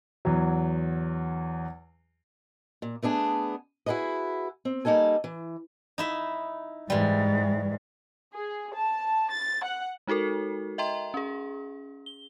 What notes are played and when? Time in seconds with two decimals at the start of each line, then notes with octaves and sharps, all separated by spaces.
0.25 E2 E3 F#3
2.82 A#2
3.02 A3 B3 D4 G#4
3.86 E4 F#4 G#4 B4 D#5
4.65 C4
4.85 G3 A#3 D#4 A4 G#5
5.24 E3
5.98 D#4 E4 E5
6.90 G#2 E3 G3
8.33 G#4
8.74 A5
9.31 A6
9.63 F#5
10.07 G#3 D#4 F#4 A4 A#4
10.78 D#5 E5 G5 A#5 C6
11.14 C#4 G#4
12.06 G7